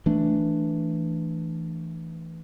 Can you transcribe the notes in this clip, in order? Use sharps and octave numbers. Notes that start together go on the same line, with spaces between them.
E3 A3 D4